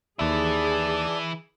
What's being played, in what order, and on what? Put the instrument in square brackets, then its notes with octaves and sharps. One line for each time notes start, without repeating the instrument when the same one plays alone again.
[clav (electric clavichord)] D#2 E5 [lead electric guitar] E3 E4 [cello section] G#4 [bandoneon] D5 A5